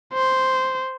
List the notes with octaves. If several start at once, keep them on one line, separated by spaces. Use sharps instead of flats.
C5